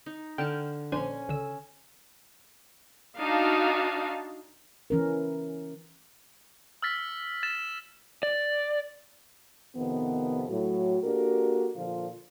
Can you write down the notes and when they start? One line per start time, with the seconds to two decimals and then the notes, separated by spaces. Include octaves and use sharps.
0.06 D#4
0.38 D3 G5 A5 F6
0.92 A#1 C#4 D4 C5 G#5
1.28 C#2 D3 E6
3.19 D4 D#4 F#4 F5 A5
4.90 E3 C#4 A#4
6.82 E6 F6 A6 B6
7.43 A6 E7
8.23 D5
9.76 F2 C3 D#3 B3
10.50 A2 F#3 F#4
11.03 A#3 D4 F#4 G4 A4 A#4
11.76 A#2 D3 F3 F4